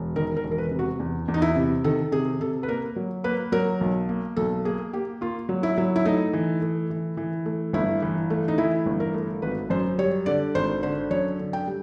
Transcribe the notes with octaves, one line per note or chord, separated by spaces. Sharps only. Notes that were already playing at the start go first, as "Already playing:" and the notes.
Already playing: E1
D#3 A#4
A#4
E1
A#4
B4
C3
F#4
E2
E2
D#4
E4
C3
D#3 A4
C3 G#4
C3 A4
B4
A#3 A#4
F#3
A#3 B4
F#3 A#4
B1
A#3
B1 A4
A#3 G#4
A#3 G4
A#3 F4
F#3
E4
F#3
E4
A3 D#4
E3
A3
E3
E3
A3
G1 E4
E3
A3
D#4
E3 E4
G1
A#4
A3
G#1 B4
F#2 C5
G3 C#5
D3 D5
G#1 C5
D3 C5
F#2 C#5
D3
G5
G3